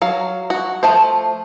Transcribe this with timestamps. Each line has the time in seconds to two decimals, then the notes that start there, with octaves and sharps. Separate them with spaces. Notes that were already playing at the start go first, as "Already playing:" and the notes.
0.02 F#3 F5
0.50 F#4
0.83 F3 A3 C5